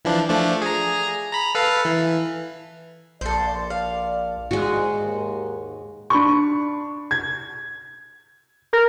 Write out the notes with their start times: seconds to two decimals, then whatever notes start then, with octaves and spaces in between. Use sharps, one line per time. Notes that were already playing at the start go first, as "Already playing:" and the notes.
0.05 E3 F3 D4
0.29 F3 A3 D4
0.62 G#4 A#5
1.32 A#5 B5
1.55 A4 B4 F5
1.85 E3
3.21 A#1 A4 C5 D5
3.70 F5
4.51 G#2 G#3 F#4
5.01 D#2
6.10 D4 B5 C#6
7.11 G#6
8.73 A#4